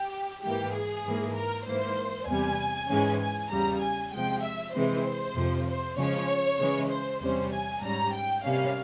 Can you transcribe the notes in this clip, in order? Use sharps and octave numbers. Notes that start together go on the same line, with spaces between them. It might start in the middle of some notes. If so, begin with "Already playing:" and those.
Already playing: G4
G#2 E3 A#3 G4
G#4
G#2 E3 A#3
A#4
G#2 E3 A#3 C5
E2 C3 G3 G#5
G#2 E3 G#3 C#4
G#5
E2 C#3 G3 A#5
G#5
C3 F3 G#3 G5
E5
C3 E3 G#3 C4 C5
F2 C3 F3
C5
C#3 F3 G#3 C#4 C#5
C#3 E3 G#3 C#4
C5
E2 C3 G3 C#4 C5
G#5
G#2 G3 C#4 A#5
G5
C3 G3 A#3 C#4 F5